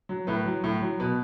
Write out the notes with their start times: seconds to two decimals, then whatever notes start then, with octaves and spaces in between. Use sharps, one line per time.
0.09 F#3
0.27 A2 B4
0.46 F#3
0.64 A2
0.82 F#3
1.00 B2 B4